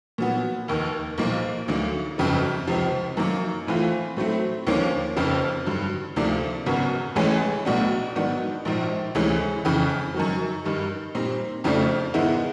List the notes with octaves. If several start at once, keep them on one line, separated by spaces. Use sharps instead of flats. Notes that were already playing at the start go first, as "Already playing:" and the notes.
A#2 F#3 B3
F1 D#2 D#3
B1 A#2 F3 A#3
D2 D3 F#3 A#3 D#4
G1 F2 C#3 F#3
C#2 C3 F3
F#2 D#3 F#3 A#3
A2 E3 A3 C4 F4
A2 F#3 A3 C4
D#2 D3 F3 A#3 C#4
F1 F2 C#3 F3
G2 D3 F#3
D2 C3 F3 A#3 D4
G#1 F#2 C#3 F#3 B3
A1 A2 E3 G#3 C#4
B1 A2 F#3 B3 D4
G#2 D#3 F#3 B3 D4
A#1 G#2 F3
D2 C3 E3 G#3 C#4
F2 C#3 E3
F#2 D#3 F#3
G2 D#3 G3
A#2 G3 C4 D#4
F2 C#3 F3 A3 D4
G#2 D#3 G#3 B3 E4